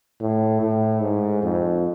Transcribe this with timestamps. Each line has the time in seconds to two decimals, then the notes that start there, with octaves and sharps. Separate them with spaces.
0.21 A2
0.61 A2
1.02 G#2
1.43 F2